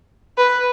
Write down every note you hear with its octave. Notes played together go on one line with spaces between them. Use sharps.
B4